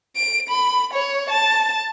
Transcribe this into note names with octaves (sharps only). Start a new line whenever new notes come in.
D7
B5
C#5
A5